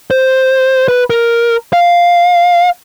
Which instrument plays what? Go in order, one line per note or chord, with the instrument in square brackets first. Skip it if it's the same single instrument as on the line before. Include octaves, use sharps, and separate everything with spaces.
[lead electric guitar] C5
B4
A#4
F5